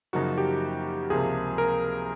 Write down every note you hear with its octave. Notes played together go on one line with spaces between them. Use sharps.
F#2 C#3 F3 A#3 D#4 F#4
G4
C#2 C3 F3 A#3 G#4
A#4